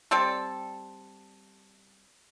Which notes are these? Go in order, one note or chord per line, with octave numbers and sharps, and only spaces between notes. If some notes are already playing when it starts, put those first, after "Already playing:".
G3 C4 A4